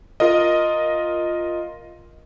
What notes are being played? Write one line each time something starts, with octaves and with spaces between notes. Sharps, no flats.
F4 A#4 D#5